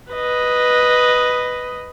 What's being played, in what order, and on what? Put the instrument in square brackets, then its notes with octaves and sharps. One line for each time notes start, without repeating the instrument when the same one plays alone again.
[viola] B4 D#5